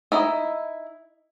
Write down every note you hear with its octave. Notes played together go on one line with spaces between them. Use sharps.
D#4 E4 D#5